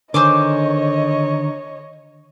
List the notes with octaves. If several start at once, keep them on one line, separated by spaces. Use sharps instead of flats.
D3 D#3 C5 C#5 D#5 G#5 D6